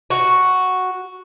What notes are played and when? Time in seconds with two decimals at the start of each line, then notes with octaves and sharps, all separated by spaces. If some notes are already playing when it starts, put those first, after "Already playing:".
0.10 F#4